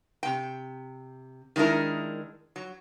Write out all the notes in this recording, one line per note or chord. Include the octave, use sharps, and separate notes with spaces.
C3 G5
D#3 G#3 D4 E4 A#4
F#3